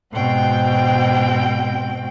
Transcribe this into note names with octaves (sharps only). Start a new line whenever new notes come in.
G#2 B2 C4 G5